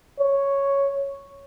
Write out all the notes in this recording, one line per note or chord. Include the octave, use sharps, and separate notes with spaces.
C#5